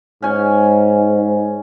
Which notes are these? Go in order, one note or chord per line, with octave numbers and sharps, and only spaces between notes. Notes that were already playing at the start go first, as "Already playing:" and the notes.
G#2 C#4 G#5